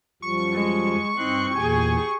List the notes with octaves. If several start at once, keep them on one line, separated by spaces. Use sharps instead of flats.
F#2 F3 G3 C#6
G#3
G2 C4 D#4 C6 F#6
E2 A#2 G4 G#4 G#5